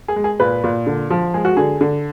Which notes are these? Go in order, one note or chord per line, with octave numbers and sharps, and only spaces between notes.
G#4
G#3
G#4
A#2 B4
A#2
D3
F3
G#3 G#4
F#4
D3 G#4
D3